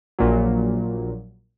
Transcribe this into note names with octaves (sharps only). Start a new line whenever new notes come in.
A#1 A#2 F#3